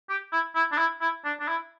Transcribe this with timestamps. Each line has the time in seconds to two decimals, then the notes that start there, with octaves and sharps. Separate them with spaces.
0.09 G4
0.32 E4
0.55 E4
0.72 D4
0.78 E4
1.01 E4
1.25 D4
1.40 D4
1.48 E4